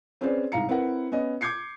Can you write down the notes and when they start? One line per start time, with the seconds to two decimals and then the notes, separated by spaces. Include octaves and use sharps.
0.21 C4 C#4 G#4 B4 C5 D5
0.52 C2 G#2 F5 A#5 C#7
0.69 C4 E4 A#4 B4 F#5
1.12 B3 C#4 D#5
1.41 D6 G6 G#6 C7 C#7